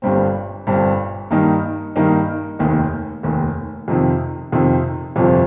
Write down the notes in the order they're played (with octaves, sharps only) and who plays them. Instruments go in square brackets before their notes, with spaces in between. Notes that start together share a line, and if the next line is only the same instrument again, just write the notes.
[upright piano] G1 G2 G3 C4
G1 G2 G3 C4
G2 D#3 A#3 D#4
G2 D#3 A#3 D#4
F1 D#2 D#3
F1 D#2 D#3
F2 C3 D#3
F2 C3 D#3
G1 F2 C3 F3